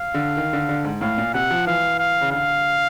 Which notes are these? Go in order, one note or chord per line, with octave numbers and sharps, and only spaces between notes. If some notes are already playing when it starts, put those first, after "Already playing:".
Already playing: F5
D3
D#3
D3
D3
G#2
A2 F5
A#2
C3 F#5
F3
E3 F5
F5
C#3
D3 F5